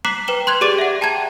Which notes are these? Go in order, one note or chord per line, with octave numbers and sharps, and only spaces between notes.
A#5 D6 F#6 B6 C7 F#7
B4 G5 E7 G7
C6 F#6 G#6 F7
G4 G#4 D5 D6 A6 D7
E5 F#5
G5 A5 A#5 G#6 D#7